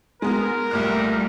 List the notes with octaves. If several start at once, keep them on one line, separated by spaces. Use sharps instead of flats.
G#3 B3 A#4
C2 A#2 G3 A3 F6